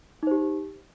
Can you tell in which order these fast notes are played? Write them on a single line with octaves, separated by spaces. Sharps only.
D#4 C5 G4